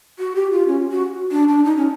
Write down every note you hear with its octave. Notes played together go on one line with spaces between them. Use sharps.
F#4
G4
F4
C#4
F#4
D4
D4
D#4
C#4